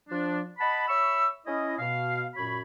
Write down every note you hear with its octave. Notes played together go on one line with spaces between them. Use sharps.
F3 D4
D#5 F#5 A5 B5
C#5 E5 B5 C#6 E6
C#4 E4 D#5
B2 F5
F#2 A#2 F#4 C#5 B5